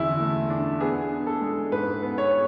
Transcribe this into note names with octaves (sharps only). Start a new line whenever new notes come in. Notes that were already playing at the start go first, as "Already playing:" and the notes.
Already playing: E2 D3 E4
A3
D4
B3 G#4
D4
A4
G#3
G#2 B4
B3
C#5